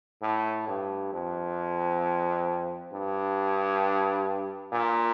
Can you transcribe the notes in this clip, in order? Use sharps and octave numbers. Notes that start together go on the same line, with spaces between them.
A2
G2
F2
G2
A#2